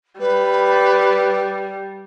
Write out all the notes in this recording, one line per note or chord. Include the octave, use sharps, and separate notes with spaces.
G3 B4